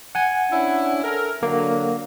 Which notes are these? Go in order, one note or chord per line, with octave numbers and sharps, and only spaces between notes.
F#5 G#5
C#4 D4 E4
A4 A#4
D3 F#3 A#3